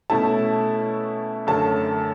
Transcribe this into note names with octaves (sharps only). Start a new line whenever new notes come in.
B2 A3 C#4 E4 A5
F#2 D3 A3 C#4 A5